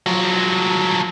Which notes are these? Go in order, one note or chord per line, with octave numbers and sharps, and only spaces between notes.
F3 F#3